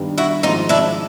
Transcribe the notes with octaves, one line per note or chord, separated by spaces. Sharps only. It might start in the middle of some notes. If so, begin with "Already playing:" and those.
Already playing: G2 D#3 G3 B3 D4
E4 F#4
G#1 G#2 F3 D#4 F4
D4 E4